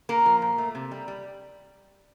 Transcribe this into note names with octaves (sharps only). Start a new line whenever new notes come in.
A#2 A#3 A#4
F3
A#2
A3
C3
G3
G3